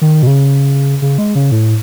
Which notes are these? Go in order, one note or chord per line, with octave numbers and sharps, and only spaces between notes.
D#3
B2
C#3
C#3
G#3
C#3
A2